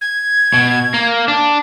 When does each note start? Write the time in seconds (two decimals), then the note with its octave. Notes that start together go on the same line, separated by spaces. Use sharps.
0.01 G#6
0.54 B2
0.94 A#3
1.28 D4